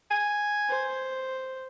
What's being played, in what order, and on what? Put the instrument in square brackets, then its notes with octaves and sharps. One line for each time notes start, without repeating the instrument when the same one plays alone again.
[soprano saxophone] G#5
[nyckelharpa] C5